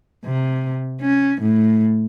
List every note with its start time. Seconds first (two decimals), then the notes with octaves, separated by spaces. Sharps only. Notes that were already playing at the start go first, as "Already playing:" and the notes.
0.25 C3
1.02 C#4
1.42 A2